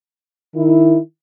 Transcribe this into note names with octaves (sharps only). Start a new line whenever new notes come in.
D#3 E4